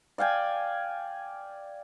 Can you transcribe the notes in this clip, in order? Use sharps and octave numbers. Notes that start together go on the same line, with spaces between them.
D5 F5 G5 G#5